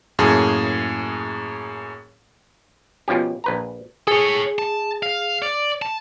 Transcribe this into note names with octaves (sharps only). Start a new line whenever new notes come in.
F#2 A2 A#3 G#4 A5
B2 F3 C#4 G4
A#1 B4 A#5
G#4 A4 C#5
A5
F5
D5
A5